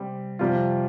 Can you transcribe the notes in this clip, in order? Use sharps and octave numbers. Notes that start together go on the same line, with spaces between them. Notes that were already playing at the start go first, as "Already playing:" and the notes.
Already playing: C3 G3 C4 G4
F2 C3 G3 F4